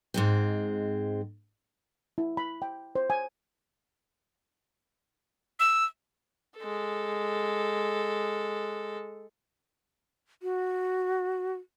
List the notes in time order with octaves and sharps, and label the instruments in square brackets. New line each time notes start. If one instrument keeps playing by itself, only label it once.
[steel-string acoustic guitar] G#2 G#3 C4
[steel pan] E4
B5
G5
C5
G#5
[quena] E6
[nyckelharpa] G#3 A4
[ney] F#4